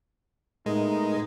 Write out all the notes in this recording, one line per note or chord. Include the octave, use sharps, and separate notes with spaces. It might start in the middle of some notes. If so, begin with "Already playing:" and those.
A2 G#3 A3 B3 D#4 A#4 D#5